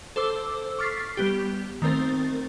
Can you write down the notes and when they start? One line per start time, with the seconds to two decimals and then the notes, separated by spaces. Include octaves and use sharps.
0.16 A4 C5 D6 E6
0.79 C#6 D6 F6 A6 B6 C7
1.17 G3 B3 G4
1.82 D#3 A3 C4 A#4 C5 A6